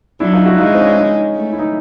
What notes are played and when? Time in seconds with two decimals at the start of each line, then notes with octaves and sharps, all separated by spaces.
0.20 F#3 D4 E4
0.33 D#4 F4
0.45 E4 F#4
0.58 G#3 D#4 F4
0.74 C4
0.81 C#4
0.89 D4
0.96 C#4 D#4
1.35 A3
1.52 E4
1.59 D#4